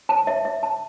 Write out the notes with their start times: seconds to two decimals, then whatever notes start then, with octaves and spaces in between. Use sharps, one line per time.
0.09 A5
0.27 E5
0.45 E5
0.63 A5